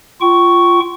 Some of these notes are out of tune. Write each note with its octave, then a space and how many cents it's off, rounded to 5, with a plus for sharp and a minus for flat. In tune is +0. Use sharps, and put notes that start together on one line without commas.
F4 -10 G5 -30 C#6 +0